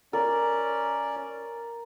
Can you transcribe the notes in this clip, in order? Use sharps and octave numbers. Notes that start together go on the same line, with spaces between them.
C#4 A#4 D5